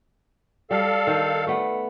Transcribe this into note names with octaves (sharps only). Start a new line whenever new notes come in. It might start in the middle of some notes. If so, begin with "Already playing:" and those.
G3 A4 F5
D#3
A3 B3